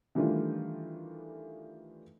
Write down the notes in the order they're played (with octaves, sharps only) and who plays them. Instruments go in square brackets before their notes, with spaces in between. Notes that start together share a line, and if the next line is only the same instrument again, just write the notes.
[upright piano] D#3 E3 G3 A3 D4 F4